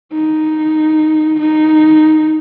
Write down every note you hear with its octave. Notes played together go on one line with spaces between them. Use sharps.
D#4
D#4